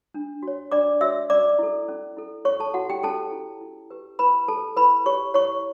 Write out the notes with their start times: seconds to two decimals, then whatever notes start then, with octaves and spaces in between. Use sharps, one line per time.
0.14 D4
0.43 F#4 C#5
0.72 D4 D5 D6
1.01 F#4 C#5 E5 E6
1.30 C#4 D5 D6
1.59 E4 A4
1.88 C#4
2.17 E4 A4
2.45 C#4 C#5 C#6
2.60 A4 A5
2.74 E4 F#4 A4 F#5
2.90 G4 G5
3.03 C#4 A4 A5
3.32 E4 A4
3.61 E4
3.90 G4 B4
4.19 E4 B4 B5
4.48 G4 A4 B4 A5
4.77 E4 B4 B5
5.06 G4 B4 C#5 C#6
5.34 E4 C#5 C#6